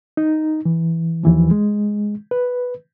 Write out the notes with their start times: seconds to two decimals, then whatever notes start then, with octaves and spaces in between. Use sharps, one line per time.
0.17 D#4
0.65 E3
1.24 D#2 E3 F3
1.51 G#3
2.31 B4